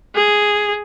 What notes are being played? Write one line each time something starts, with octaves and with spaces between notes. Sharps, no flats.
G#4